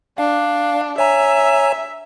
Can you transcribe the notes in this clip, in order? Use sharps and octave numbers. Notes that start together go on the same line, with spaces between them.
D4 F5
C#5 E5 G#5 A#5